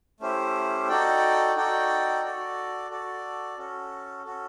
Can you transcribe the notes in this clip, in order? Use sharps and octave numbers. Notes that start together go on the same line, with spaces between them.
A3 C#4 E4 G4 C5
D#4 F#4 A4 D5 G5
D#4 F#4 A4 D5 G5
F#4 A4 D5
F#4 A4 D5
C#4 F#4 A4
C#4 F#4 A4